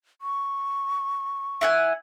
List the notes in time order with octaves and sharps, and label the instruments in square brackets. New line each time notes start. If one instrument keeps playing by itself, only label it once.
[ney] C#6
[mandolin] E4 F#5 G#5